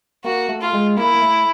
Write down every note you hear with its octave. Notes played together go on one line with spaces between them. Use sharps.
A#3 F#4
A3
F4
G#3
A#3 E4
A#3
A3